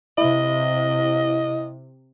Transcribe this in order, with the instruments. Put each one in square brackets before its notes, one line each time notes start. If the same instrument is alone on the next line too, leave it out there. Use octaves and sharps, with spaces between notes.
[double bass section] C3 [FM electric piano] E4 [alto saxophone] D#5